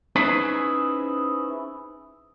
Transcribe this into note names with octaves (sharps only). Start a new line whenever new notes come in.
C#4 D#4 E4 G#4 B4 C5